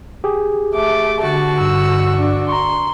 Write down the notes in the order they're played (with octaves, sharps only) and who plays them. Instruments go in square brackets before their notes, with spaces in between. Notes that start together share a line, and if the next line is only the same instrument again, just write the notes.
[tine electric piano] G4 G#4
[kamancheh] A3 D6
[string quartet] D3 F#4 [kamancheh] A5
[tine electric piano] G2 [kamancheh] E6
[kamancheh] D4
[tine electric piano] A#5 C#6 [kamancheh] C6